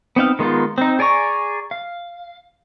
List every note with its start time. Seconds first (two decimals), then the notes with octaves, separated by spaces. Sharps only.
0.16 B3 C4 D#4 F5
0.39 D#3 G#3 B3 D#4 F4
0.78 C4 D#4
0.99 G#4 D5 G#5 A#5 C#6
1.71 F5